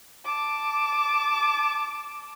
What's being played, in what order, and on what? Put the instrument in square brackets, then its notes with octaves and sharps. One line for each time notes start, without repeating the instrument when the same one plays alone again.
[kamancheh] A5 D6